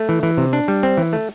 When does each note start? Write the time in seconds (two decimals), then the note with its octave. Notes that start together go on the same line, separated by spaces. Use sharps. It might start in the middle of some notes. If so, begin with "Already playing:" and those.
Already playing: A3
0.09 E3
0.23 E3
0.38 C3
0.53 D4
0.68 G3
0.83 C4
0.98 E3
1.13 A3